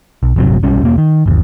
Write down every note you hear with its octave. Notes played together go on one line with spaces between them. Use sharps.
B1
D1 G1 C3 F#3
B1 G3 C#4
E1 A#3
D#3
G1 D#2